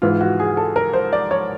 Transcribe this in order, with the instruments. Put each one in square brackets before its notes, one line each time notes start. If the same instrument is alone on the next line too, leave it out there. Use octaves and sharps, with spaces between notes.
[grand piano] G#2 E3 F4
F#4
G#4
A4
A#4
C5
D5
C#5